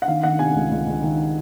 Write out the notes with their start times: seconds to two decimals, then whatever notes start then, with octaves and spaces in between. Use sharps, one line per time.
0.02 F#5
0.08 D#3 F5
0.23 D#3 F#5
0.39 C3 G#5
0.55 C#2
0.71 C#2
0.87 C#2
1.03 D#3